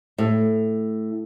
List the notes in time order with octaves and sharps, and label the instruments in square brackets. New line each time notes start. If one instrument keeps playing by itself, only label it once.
[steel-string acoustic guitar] A2